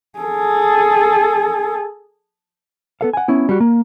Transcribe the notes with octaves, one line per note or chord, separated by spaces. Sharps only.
G#4 A4
B3 A4 F5
F#5 G#5
B3 C#4 E4
G3 F#4
A#3